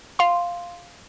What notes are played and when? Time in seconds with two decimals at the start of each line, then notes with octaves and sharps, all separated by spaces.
0.19 F5 C6